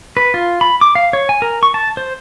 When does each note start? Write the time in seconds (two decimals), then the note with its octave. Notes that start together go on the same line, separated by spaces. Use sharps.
0.17 B4
0.34 F4
0.61 B5
0.81 D6
0.95 F5
1.13 C#5
1.29 G#5
1.42 A#4
1.63 C#6
1.74 A5
1.97 C5